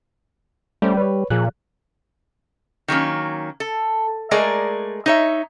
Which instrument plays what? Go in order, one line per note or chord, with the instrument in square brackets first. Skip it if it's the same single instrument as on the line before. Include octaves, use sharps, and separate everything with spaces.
[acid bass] G3 [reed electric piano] A3 C#4 C5
[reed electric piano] B4 C#5
[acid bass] A#2 [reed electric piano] F3 G#4 F#6
[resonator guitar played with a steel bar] D#3 F#3 A#3 C#4
A4
G#3 A3 G#4 A#4 D5
D#4 C#5 E5